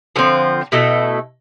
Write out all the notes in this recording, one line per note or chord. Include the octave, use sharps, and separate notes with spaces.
D3 F3 C4
B2 A3 E4 A4